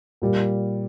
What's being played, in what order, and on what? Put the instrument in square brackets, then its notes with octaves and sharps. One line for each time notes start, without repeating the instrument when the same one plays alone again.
[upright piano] A#2 G3